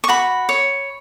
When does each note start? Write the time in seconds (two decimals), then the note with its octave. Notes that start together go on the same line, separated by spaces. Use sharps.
0.04 C#6
0.09 F#4 B5
0.49 C#5